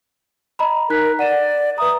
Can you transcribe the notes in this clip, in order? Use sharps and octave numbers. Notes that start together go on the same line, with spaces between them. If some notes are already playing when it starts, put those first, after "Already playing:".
D#5 A#5 B5
D#4 A#4 F#6 B6
D5 F#5 D#7 E7
F#5
B4 E5 A#5 D#6